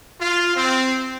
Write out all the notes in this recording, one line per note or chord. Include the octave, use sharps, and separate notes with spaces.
F4
C4